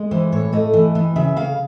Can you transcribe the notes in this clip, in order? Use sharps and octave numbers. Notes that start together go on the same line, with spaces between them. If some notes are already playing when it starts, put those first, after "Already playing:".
Already playing: G#3
E3 C5
A2 C#5
A3 D#5
E3
E3
C#3 E5
C#3 F5